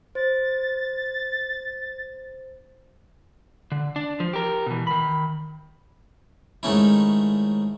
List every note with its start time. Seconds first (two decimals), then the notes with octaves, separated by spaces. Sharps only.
0.15 C5 A6
3.72 D3
3.96 D4
4.20 F3
4.33 G4 A#4
4.66 B2 E3
4.87 D#3 B5
6.63 G#2 D#3 A3 C#4 E4